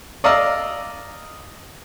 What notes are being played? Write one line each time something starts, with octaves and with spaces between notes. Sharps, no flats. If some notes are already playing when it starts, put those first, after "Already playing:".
D5 D#5 F5 A#5 D#6 E6